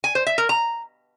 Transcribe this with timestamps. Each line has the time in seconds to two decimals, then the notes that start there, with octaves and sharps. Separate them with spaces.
0.04 G#5
0.15 C5
0.27 E5
0.38 A#4
0.49 A#5